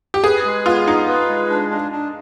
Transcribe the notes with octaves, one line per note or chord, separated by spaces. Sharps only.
G4
G#4 B4
G#3
B3 F4
D#4 F4
B4
G#3
D4
D4
D4